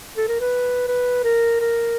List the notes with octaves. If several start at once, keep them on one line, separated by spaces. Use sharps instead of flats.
A4
A#4
B4
B4
A#4
A#4